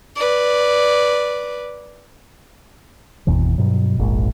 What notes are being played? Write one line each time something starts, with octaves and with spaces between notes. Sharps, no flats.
B4 D5
G#1 E2 B2 E3
G2 B2 F#3
F1 A#1 G#2